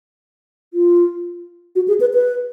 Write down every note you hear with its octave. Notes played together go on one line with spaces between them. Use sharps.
F4
F#4
G#4
B4
B4